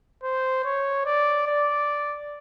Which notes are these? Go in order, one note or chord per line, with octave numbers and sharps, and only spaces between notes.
C5
C#5
D5
D5